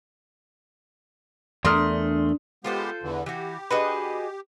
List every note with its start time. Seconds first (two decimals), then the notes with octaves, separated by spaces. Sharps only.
1.65 E2 A3 D4 A#4 C6 D#6 F6
2.64 G#3 B3 F4 G4 A4 C5
3.03 E2 D3 E3
3.26 E3 F#4 G4
3.71 D3 F#4 G#4 B4 D#5